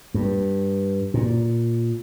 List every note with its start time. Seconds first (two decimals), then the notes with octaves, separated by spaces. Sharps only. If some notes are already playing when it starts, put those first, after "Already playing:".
0.14 G2
1.14 A#2